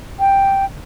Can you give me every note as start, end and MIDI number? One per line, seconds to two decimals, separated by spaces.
0.20 0.65 79